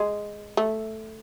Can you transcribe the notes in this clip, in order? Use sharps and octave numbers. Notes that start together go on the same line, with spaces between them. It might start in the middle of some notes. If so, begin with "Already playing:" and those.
Already playing: G#3
A3